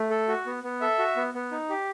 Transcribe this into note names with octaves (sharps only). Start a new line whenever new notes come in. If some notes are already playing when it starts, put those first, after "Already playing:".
Already playing: A3
A4
F#4
B3
B3
A4 E5
F#4
B3
B3
D#4
G4